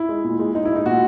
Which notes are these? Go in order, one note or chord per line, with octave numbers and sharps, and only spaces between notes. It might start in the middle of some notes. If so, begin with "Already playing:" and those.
Already playing: E4
G#3
A#2
G#3
G#3 D#4
E4
G#3 D#4
A#2 F#4